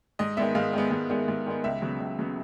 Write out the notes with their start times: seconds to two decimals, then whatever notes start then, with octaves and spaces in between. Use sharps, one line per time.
0.19 G#2 D#5
0.37 D#3 G#3 B3 E5
0.55 G#2 F5
0.73 D#3 G#3 B3
0.91 G#2
1.10 D#3 G#3 B3
1.28 G#2
1.46 D#3 G#3 B3
1.64 C#2 E5
1.82 C#3 F#3 B3
2.00 C#2
2.19 C#3 F#3 B3